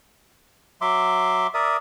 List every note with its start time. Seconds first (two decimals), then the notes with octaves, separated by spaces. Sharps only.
0.81 F#3 E5 C6 D6
1.54 A#4 D5 E5 D#6